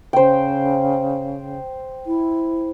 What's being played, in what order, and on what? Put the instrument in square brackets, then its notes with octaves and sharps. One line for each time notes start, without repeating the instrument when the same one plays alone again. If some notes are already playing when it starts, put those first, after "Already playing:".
[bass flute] C#3 [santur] C5 G5
[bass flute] E4